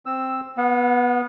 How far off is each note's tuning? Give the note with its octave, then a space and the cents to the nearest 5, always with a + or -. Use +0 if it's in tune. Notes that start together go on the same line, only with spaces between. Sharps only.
C4 +0 E6 +0
B3 -10 F#5 -45